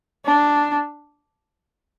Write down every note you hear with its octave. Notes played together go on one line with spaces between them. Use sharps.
D4